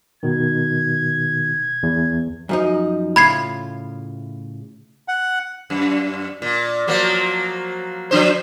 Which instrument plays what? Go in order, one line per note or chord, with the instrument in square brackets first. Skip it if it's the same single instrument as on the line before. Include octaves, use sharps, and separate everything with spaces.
[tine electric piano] B2 D#3 [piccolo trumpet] G#6
[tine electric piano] E2
[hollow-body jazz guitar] F#2 F3 D#4
[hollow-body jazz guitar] A2 C#3 F4 [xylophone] B5 G#6 C7
[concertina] F#5
[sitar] F#2
A#2
F3 F#3 A#3
F3 D4 C5